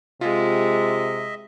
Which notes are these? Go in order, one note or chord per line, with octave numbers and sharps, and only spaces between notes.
C3 G#3 F4 D#5 E5